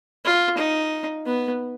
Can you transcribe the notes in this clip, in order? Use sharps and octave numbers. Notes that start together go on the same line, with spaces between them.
F4
D#4
B3